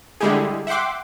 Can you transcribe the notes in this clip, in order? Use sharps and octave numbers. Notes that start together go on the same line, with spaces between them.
D3 G3 G#3 E4 G4 G#4
E5 F#5 G5 C6 D6